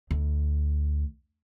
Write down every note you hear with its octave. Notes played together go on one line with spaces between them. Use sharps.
D2